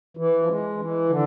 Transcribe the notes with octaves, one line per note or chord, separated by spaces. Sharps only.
E3
F3
G#3
E3
D3